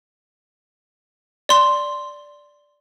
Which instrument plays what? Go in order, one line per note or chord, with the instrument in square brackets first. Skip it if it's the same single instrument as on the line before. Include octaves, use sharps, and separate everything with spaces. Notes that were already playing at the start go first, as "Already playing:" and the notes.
[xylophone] D5 C6